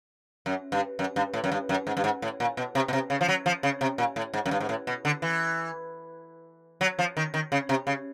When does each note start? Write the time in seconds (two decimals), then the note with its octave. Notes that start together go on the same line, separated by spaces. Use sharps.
0.46 F#2
0.72 G2
0.99 F#2
1.16 G2
1.34 A2
1.44 F#2
1.52 G2
1.69 F#2
1.87 G#2
1.97 G2
2.04 G#2
2.22 A2
2.40 A#2
2.57 B2
2.75 C3
2.88 B2
2.93 C3
3.10 C#3
3.21 F3
3.28 F#3
3.46 F3
3.63 C#3
3.81 C3
3.98 A#2
4.16 A2
4.34 G#2
4.46 F#2
4.51 G2
4.60 G#2
4.69 A2
4.87 B2
5.05 D3
5.22 E3
6.81 F#3
6.99 F3
7.17 D#3
7.34 D#3
7.52 C#3
7.69 C3
7.87 C#3